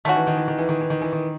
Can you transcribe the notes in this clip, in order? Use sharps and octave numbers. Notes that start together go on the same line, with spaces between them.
D#3 A3 C#4 F#4
E3
D#3
E3
D#3
E3
D#3
E3
D#3
E3
D#3